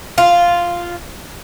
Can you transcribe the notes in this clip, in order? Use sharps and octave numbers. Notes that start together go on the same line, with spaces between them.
F4